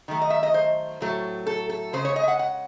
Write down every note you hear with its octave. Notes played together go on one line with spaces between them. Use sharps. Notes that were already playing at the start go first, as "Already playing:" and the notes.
D#3 F#3 A3
D#5
E5
D#5
C5
A2 F#3 A3
A4
A4
C#3 G#3 C5
C#5
D#5
E5
F#5
F#5